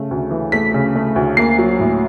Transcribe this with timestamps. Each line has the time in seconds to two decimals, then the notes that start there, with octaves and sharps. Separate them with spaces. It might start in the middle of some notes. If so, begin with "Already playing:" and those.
Already playing: C#3 A3
0.11 D2
0.31 E3
0.52 A3 B6
0.74 C#3
0.95 A3
1.16 D2
1.37 A#3 C7
1.59 F#3
1.80 A2